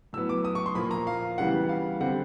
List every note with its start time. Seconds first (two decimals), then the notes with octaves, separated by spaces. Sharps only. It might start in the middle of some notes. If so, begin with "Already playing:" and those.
0.13 A2 F#3 B3 E6
0.29 D6
0.45 D#6
0.55 C#6
0.66 C6
0.75 A#2 F3 A#3 B5
0.91 A#5
1.07 F5
1.38 C#3 E3 G3 B3 F#5
1.69 F5
2.00 D3 G3 C4 F#5